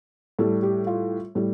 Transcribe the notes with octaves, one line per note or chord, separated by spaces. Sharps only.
A2 G3 A4
G4
F4
A2 G3